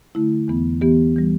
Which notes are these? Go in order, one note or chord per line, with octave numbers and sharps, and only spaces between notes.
D3 A3 E4
E2 E3 B3
E3 B3 G4
E3 G3